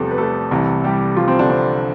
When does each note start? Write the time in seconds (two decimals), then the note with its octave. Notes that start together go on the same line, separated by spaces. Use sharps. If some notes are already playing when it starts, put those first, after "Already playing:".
Already playing: E2 C3 F3 G3 A3 B3 G4 A4
0.11 B4
0.18 A3 A4
0.51 C2 C3 E3
0.84 G3 G4
1.17 F3 F4
1.28 C4
1.39 D3 D4
1.50 C4